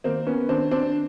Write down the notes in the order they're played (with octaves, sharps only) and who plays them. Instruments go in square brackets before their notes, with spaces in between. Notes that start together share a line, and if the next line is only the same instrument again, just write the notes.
[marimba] D#3 [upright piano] A#3 C4
[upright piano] B3 C#4
[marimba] D#3 [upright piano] C4 D4
[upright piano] C4 D4